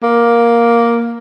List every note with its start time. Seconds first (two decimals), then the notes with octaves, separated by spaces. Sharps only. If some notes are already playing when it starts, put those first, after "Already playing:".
0.03 A#3